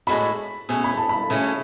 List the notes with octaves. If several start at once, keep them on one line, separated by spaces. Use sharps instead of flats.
A2 G#3 D4 F#4 B5
B2 A3 C#4 G#4 C#5
B5
A5
B5
C#3 E3 A3 C#4 F#4